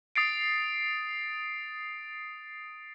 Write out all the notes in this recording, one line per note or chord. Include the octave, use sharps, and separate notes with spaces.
D#6 A6 C7 D7